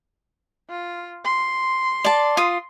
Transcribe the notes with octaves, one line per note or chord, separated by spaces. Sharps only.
F4
C6
D5 A5
F4 D#6